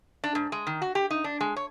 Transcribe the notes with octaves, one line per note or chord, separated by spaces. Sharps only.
D4
G#2
G#3
D#3
F#4
G4
D#4
D4
G#3
C#5